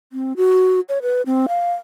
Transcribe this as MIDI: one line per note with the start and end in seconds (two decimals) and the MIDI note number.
0.13 0.33 60
0.37 0.80 66
0.89 0.99 73
1.02 1.22 71
1.26 1.46 60
1.48 1.73 77